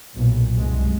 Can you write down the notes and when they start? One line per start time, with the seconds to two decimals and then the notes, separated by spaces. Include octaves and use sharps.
0.16 B1 A#2
0.56 C2 F#2 G#3